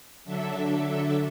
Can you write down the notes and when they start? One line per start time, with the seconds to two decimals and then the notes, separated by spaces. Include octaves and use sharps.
0.24 D3 F#3 D4 A4 E5